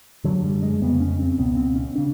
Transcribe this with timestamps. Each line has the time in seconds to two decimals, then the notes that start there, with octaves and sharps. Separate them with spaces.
0.24 F#2 D3 F#3
0.44 G3
0.63 G#3
0.81 F2 C#3 B3
1.00 C#4
1.20 C4
1.38 C#2 B2 B3
1.57 C4
1.76 C#4
1.96 C#3 D4